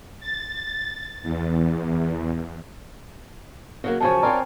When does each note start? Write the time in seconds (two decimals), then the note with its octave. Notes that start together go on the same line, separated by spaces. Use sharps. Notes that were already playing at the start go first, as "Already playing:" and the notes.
0.20 A6
1.23 E2
3.84 C#3 F#3 A#3
4.00 F#2 C#3 F3 C#5 G#5 A5
4.23 C4 F4 A#4 C#5 D5